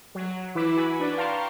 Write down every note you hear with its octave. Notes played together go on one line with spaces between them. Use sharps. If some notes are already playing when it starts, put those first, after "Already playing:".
F#3
E3 E4 B4 D6 E6
F#4 G#5 B5
D4 B4 D5
F5 G5 A5 A#5 C6 C#6